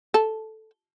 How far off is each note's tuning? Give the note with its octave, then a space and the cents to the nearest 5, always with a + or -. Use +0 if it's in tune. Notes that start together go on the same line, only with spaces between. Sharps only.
A4 -5